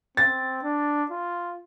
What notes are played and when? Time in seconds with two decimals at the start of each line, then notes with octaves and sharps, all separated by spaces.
0.17 C4 A6
0.63 D4
1.11 F4